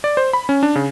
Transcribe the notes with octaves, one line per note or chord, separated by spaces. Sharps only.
D5
C5
B5
C#4
D4
C#3